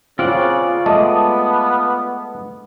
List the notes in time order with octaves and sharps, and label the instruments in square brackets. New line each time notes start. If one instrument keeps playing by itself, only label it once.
[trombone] C#3 [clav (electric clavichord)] C4 [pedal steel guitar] F4 D5 F#5
[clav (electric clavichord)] G#3 A3 D#5 [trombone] B3 [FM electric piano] A5 D6 D#6